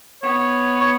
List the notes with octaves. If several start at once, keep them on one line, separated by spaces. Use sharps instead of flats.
B3 C#5
C#5